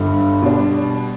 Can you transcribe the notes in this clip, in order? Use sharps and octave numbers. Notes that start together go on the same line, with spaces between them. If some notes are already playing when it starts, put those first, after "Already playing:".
Already playing: G1 G2 D3
B2 G3 D4